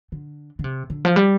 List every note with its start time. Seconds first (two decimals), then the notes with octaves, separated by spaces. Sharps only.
0.12 D3
0.59 D3
0.64 C3
0.90 D3
1.05 F3
1.16 G3